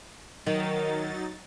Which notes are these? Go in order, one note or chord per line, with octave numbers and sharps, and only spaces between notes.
D#3 F#3 D#4 A6